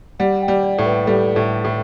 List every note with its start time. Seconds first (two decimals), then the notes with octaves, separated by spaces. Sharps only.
0.19 G3 F#5
0.42 G5
0.48 G3
0.63 D5
0.78 A2
0.85 B4
1.06 G3 A4
1.36 A2
1.64 A2